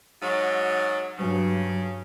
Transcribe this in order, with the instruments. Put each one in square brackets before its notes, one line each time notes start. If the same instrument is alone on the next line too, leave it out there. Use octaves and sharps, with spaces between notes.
[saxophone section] G#2 F#3
[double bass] G2 F#3 [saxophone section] C#3